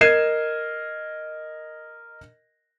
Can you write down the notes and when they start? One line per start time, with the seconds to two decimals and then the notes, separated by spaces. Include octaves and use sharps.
0.01 A#4 D#5 G#6 C7 D#7 E7